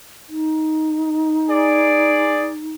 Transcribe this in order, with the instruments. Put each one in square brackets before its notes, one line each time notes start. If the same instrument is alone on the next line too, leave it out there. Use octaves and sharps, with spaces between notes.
[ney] D#4
[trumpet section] G#4 D5